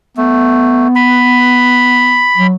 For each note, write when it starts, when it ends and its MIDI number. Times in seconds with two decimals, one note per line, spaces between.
0.17 0.88 57
0.17 2.28 59
0.96 2.47 83
2.38 2.55 54